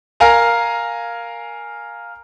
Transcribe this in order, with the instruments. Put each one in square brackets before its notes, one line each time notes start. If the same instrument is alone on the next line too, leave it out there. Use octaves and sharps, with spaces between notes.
[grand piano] A#4 F5 G#5 A#5